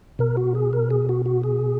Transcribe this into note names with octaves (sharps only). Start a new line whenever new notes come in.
B2 A#4
F#4
G#4
A#4
G#4
F#4
F#4
G#4